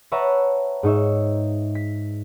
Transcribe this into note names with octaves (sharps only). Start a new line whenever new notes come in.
B4 C#5 E5 F#5 A5 A#5
G#2 D#4 C#5 E5
B6